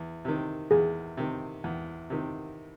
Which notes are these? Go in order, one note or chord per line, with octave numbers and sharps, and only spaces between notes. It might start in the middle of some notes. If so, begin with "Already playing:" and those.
Already playing: E2
C3 D#3
E2 G#4
C3 D#3
E2
C3 D#3